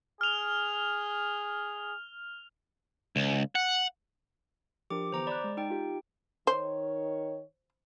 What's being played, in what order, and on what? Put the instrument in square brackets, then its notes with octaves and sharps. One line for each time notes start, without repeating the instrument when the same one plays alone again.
[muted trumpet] G#4 [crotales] F6 F7
[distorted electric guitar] C#2
F#5
[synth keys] F3 D4 A#4 [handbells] G4 D6
[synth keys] D3 E3 B3 [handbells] C5 A#5 D6
[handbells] D5 [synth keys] B5 D6 F#6
[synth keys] G#3
[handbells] D#4 G5
[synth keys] F4 G4
[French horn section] D#3 C#5 [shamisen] C5